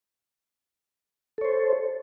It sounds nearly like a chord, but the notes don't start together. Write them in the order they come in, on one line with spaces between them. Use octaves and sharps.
A4 C#5 C5